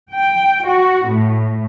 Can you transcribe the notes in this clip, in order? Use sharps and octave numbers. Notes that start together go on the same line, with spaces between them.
G5
F#4
A2